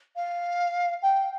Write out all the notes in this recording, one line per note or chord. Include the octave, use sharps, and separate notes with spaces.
F5
G5